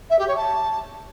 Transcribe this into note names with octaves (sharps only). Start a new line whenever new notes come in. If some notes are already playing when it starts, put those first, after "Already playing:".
E5
G4
C#5
A5